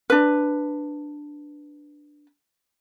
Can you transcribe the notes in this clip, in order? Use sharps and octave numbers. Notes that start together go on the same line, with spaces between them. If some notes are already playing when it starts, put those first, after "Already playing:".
D4 B4